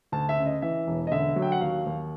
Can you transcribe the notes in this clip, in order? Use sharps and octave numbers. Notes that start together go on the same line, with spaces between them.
D2 A5
E5
C#3
D#5
E3 E5
E1
D#5
D3 E5
F#3
G5
F#5
D#2 F5
D#2